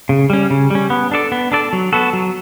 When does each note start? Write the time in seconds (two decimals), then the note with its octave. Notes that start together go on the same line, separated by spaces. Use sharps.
0.09 C#3
0.30 G3 C#4
0.50 C#3
0.70 G3 C#4
0.90 B3
1.11 D4 A4 D5
1.32 B3
1.52 D4 A4 D5
1.73 F#3
1.93 B3 F#4 A4
2.13 F#3